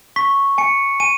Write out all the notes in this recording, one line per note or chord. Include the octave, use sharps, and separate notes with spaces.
C#6 B6
G#5 C#7
G#5 D#7